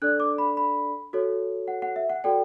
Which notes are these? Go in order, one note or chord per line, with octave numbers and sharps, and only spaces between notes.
D4 A4 D5 F#6
D6
B5
B5
F#4 A4 C#5
F#5
F#5
E5
F#5
F#4 A4 D5 G5